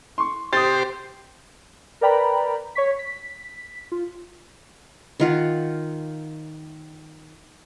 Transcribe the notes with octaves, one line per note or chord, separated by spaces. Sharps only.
C6 C#6
G4 C5 D#6 A6
A#4 B4 D5 G5 A#5 B5
C#5 C#6 B6
B6
F4
D#3 F4 F#5